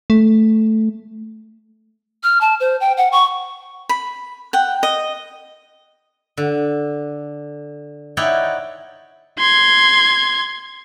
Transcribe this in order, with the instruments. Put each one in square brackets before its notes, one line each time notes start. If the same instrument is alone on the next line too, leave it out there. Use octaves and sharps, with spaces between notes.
[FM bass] A3
[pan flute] F6
A5
C5
G5
F#5
C#6
[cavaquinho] B5
F#5 G5
D#5
[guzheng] D3
D#4 E4 C#5 D5 F#5 G5
[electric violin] C6 G#6